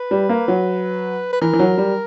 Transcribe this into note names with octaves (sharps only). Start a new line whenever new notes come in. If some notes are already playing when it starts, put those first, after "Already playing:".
Already playing: B4
G3
A#3
F#3
B4
E3 A#4
E3
F#3
G3